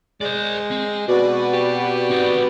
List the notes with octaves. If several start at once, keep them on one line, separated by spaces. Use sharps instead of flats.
G#3 C5 D5
C4
B2 F#4 B4 D5
G4
C4 D#4